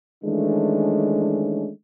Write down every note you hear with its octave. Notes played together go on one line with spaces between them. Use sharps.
D#3 E3 G#3 A3 C#4 D4